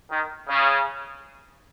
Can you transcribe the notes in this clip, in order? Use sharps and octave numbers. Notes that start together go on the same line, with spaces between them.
D#3
C#3